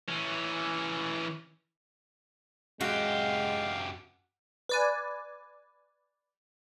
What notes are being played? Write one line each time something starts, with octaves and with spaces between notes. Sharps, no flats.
E3 C#4
F#2 G#3 F#4 G4 F5
B4 D5 G#5